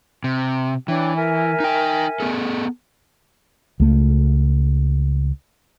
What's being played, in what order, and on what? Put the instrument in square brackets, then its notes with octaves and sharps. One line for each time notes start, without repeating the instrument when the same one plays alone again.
[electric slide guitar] C3
[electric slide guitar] E3 [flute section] D4 C#5 G5
[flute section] A#4 E5 G#5
[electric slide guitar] D#4 G5
B3 G#4 A4
[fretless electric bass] C#2 A3